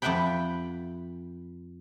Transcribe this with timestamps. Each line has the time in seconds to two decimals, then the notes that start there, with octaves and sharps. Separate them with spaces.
0.02 F2 B4 E5 F#5 G5 B5